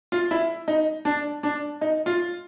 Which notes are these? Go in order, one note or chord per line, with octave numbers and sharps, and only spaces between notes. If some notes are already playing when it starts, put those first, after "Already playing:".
F4
E4
D#4
D4
D4
D#4
F4